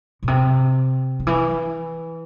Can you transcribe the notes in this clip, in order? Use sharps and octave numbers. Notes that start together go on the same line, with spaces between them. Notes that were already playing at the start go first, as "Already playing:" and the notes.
B2
C3
D#3
E3